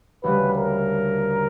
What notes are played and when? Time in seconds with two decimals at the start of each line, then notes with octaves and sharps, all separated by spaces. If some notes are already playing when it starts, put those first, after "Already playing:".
0.23 D2 C#3 G3 B4
0.56 A#4